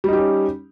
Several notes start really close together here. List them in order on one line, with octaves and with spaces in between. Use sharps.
G3 D#4 G4 C#4